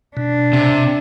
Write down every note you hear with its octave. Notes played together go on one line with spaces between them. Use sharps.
B2 D4
C3